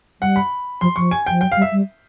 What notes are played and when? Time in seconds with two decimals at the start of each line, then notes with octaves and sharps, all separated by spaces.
0.21 G3 F#5
0.36 B5
0.81 F3 C6
0.96 F3 C#6
1.11 G#5
1.26 F3 G5
1.41 F#3 G5
1.52 G3 F5
1.62 E5
1.72 G3